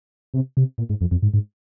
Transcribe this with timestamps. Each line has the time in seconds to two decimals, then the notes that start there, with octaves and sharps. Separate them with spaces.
0.34 C3
0.57 C3
0.78 A#2
0.89 G#2
1.01 F2
1.11 F2
1.22 G#2
1.34 G#2